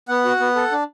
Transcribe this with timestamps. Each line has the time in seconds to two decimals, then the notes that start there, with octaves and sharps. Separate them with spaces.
0.08 B3 F#5
0.25 F#4
0.40 B3
0.56 A4
0.71 D4